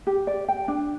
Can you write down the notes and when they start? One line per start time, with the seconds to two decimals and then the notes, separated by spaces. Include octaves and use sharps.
0.07 G4
0.27 D5
0.48 G5
0.68 D4